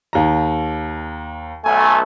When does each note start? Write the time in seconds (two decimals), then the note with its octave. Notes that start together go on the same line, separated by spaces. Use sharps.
0.13 D#2 A#5
1.65 B1 A3 G#5